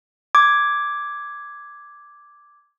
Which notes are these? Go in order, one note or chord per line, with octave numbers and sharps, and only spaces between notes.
D6 G#6